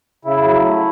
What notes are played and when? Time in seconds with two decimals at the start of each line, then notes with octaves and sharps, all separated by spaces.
0.25 C#3 E4
0.44 F#3
0.62 A3